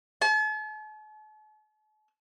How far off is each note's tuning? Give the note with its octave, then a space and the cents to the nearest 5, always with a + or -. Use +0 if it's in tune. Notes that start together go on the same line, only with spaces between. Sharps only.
A5 -45